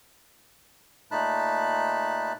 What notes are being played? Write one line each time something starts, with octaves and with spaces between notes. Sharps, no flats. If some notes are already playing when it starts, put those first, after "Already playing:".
A#2 A3 D#4 A5 B5 F#6